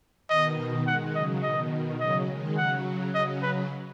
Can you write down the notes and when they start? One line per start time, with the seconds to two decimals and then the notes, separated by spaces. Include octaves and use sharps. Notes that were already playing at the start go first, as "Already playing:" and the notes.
0.29 B2 D#3 D#5
0.87 D#3 G#3 F#5
1.15 C#3 F#3 D#5
1.43 B2 D#3 D#5
2.00 C#3 F#3 D#5
2.28 D#3 G#3
2.57 C#3 F#3 F#5
3.15 C#3 F#3 D#5
3.42 B4